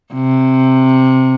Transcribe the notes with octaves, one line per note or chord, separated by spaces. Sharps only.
C3